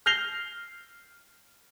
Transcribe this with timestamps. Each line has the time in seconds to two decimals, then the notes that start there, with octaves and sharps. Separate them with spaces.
0.06 F6 G6 A#6 C7 F7 G7